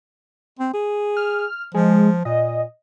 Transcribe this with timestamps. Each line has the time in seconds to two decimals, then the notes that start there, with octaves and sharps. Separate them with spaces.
0.59 C4
0.73 G#4
1.17 F6
1.74 F3 G#3
2.25 A#2 D#5